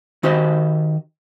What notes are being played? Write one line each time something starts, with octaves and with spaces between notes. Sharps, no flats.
D#3 D#4 F#4 G4 C5 D#5